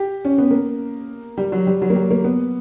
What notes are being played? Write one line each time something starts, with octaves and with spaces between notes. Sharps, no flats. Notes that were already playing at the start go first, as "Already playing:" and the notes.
Already playing: G4
C#4
B3
A#3
G3
F#3
G3
F#3
A#3
G3
A#3
B3